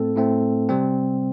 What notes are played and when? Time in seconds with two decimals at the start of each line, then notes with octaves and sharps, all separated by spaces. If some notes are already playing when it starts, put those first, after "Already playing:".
Already playing: A2 A3 C4 A4
0.16 A2 A3 C4
0.69 C3 G3 C4